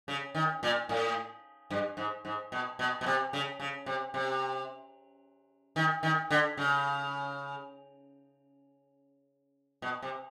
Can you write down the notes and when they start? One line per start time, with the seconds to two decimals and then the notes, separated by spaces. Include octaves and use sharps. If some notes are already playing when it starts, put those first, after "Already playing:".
0.08 C#3
0.35 D#3
0.63 A#2
0.89 A2
1.70 G2
1.97 G#2
2.25 G#2
2.52 B2
2.79 B2
3.01 B2
3.06 C3
3.33 C#3
3.60 C#3
3.86 C3
4.14 C3
5.76 D#3
6.03 D#3
6.31 D3
6.57 C#3
9.82 B2
10.02 C3